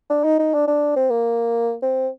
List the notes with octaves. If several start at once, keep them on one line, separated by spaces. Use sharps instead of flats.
D4
D#4
D#4
D4
D4
C4
A#3
C4